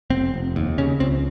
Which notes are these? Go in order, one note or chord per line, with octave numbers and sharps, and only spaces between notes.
F1 C4
F1
D#2
C#3 C#4
C#2 C4